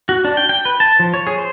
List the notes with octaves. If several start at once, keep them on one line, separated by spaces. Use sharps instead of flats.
F#4
D4
G5
G5
B4
A5
F3
C#5
G#4
C5